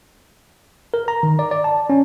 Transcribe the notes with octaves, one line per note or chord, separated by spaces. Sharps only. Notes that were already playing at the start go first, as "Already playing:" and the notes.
A#4
A#5
D#3
D5
D5
A5
C#4